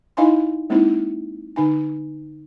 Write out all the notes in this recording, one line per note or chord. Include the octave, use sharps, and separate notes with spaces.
D#4 E4 D#5 F5 G#5 C6
G#3 A#3 C4 D#4 E4
D3 D#4 G#5